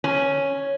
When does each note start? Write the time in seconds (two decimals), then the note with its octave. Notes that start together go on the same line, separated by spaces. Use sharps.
0.04 C#4